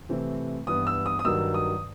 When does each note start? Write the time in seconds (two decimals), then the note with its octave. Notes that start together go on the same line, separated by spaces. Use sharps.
0.09 C3 E3 A3 C4
0.67 G2 E3 B3 D#6
0.87 E6
1.06 D#6
1.19 D#6
1.25 G2 D#3 F#3 E6
1.54 D#6